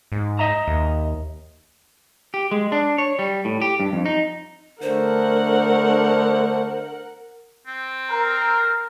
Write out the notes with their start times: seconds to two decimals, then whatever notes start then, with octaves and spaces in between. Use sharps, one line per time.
0.12 G#2
0.39 D#5 E5 A#5
0.68 D#2
2.34 G4
2.51 G#3
2.72 D4
2.98 C#5
3.19 G3
3.45 A2
3.62 G4
3.80 G2
3.93 F2
4.06 D#4
4.82 D3 A3 A#4 C5 F#5
7.67 C4
8.10 A#4